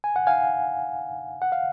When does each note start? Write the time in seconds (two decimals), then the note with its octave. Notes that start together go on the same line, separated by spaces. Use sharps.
0.04 G#5
0.16 F#5
0.27 F5 G#5
1.42 F#5
1.52 F5